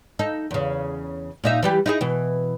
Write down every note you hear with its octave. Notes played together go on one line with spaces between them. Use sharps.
D#4 A4
E2 C#3
A#2 D#4 E5
E3 G3 G4
D#4 E4 G#4
B2 E3